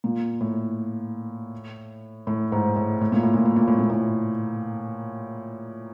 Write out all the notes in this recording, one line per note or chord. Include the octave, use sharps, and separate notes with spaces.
A#2
A2
A2
G#2
A2
A2
A#2
A2
A#2
A2
A#2
A2
A#2
A2